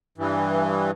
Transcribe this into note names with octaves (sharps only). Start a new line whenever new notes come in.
G2 E3